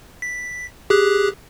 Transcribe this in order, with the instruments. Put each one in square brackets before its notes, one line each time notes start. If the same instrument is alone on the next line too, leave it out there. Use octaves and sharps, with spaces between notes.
[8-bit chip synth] B6
G4 G#4 F#6